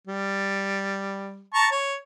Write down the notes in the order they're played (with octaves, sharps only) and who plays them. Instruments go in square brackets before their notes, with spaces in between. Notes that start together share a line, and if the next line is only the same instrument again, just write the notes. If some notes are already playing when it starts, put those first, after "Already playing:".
[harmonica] G3
A5 A#5 C#6
C#5